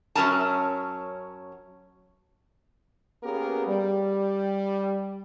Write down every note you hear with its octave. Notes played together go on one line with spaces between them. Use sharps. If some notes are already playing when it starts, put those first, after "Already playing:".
F#2 F#3 C#4 A#4 A5
A#3 B3 C#4 G4 G#4 A#4
G3